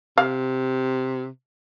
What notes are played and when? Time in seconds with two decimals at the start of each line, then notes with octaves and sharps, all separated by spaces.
0.18 C3 F5